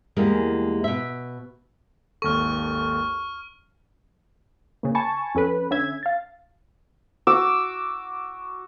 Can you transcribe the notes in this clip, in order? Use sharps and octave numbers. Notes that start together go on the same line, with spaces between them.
E2 G3 G#3 A#3
B2 E5
G#1 D#2 A4 C#6 F6
C#3 A#3
G#5 A5 B5 C#6
F2 C#4 A4 B4
D3 C#4 E5 G#6
F5 A6
F#4 D6 E6